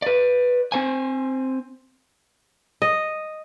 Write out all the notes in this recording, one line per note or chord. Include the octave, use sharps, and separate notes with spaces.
B4 D5
C4 C5 G#5
D#5